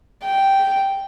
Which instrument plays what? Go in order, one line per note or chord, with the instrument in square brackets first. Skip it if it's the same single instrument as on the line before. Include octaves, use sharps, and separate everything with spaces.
[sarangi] G5